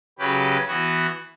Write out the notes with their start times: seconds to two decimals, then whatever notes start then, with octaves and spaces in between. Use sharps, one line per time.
0.19 C#3 F#3 C#4 G4 B4
0.68 E3 B3 F#4